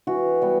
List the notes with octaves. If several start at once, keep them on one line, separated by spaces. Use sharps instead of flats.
E3 F#4
G3 B3